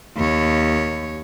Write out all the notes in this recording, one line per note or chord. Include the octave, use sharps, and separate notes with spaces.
D#2 C#5